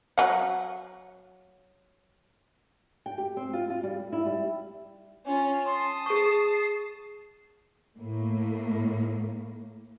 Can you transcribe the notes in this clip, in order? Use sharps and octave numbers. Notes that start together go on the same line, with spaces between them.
F#3 F#5
G5
G4
C4
F4
F4
G3
G3
E4
G3
C#4 F4
A5 C6 D#6
G#4 C#6 C7
A2 A#3